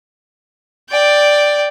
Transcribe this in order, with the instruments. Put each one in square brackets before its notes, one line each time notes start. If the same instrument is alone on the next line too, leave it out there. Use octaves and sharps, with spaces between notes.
[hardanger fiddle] D5 G5